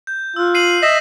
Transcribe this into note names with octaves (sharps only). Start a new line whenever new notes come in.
G6
F4 E6 F#6
C7 D#7 F#7
D#5 E5 A#6 B6 E7